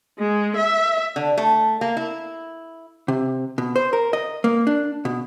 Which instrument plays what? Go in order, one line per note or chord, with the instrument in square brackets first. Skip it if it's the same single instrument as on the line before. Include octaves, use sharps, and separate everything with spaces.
[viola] G#3
E5
[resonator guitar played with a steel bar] D3
A3
A#3
E4
[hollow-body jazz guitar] C3
B2
C5
A#4
D#5
A#3
D4
B2